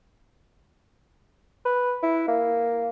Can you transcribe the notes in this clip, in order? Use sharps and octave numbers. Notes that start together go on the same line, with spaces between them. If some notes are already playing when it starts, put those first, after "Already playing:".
B4
E4
A#3